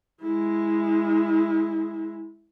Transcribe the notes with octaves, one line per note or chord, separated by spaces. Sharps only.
G#3 E4